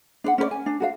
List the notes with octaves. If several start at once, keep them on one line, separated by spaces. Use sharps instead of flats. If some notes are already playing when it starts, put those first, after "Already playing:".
D4 C5 F#5
C#4 B4 D5
G#5
D4
F#4 A4 F5